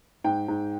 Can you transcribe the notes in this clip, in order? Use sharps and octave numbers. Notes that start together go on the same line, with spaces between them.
G#2 G5
G#2